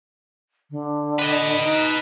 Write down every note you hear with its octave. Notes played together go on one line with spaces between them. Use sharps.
D3
B4 D#5
D#4